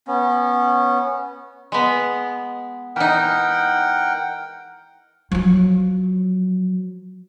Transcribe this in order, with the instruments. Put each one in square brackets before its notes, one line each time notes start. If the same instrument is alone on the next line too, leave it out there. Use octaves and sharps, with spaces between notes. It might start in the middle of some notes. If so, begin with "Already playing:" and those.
[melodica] B3 C#4
[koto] G#3 B3
[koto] E3 D#4 [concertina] A#4 F#5 G5
[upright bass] F3 F#3